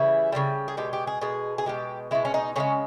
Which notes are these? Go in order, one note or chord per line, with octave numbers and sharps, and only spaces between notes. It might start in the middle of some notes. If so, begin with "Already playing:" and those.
Already playing: C#3 E3 G3 E4
C#3 E3 G3
G#4
B2 G#3 G4
G4
G#4
B2 G#3 G#4
G#4
B2 G#3 G4
B2 G#3 E4
C#4
D#4
C#3 E3 G#3 C#4